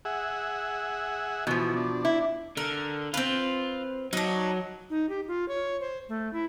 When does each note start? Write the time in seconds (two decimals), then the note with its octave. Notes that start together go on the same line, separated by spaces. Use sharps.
0.05 G#4 E5 F#5
1.47 B2 E3 F3 B3
1.76 D4
2.05 E4
2.57 D3 A#4
3.14 C4 F4 B4
4.13 F#3 D4 D#4
4.90 D#4
5.09 G4
5.28 F4
5.48 C#5
5.81 C5
6.09 A3
6.33 E4